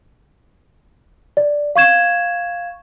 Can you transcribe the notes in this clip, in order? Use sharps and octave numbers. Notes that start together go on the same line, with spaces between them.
D5
F5 C#6 G#6 E7